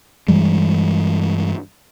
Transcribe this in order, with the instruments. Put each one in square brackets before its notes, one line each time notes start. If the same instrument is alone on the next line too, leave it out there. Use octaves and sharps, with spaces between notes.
[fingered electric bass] G2 E3 G3 G#3